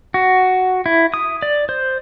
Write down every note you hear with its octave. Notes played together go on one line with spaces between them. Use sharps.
F#4
E4
D#6
D5
C5